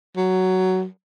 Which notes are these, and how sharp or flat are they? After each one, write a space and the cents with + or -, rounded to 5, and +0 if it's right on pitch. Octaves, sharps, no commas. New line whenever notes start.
F#3 +10